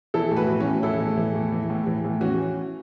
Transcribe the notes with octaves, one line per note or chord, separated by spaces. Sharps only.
E3 E4 A4
A2
F#4 B4
E3
C#4 F#4
A2
E3 E4 A4
A2
E3
A2
E3
A2
E3
A2
E3 C#4 F#4